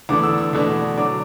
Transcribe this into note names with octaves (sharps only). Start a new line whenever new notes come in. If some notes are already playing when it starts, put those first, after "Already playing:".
E2 D3 A3 D4 D6
E6
E6
E2 B2 A3 D4
D3 F#3 D4 D6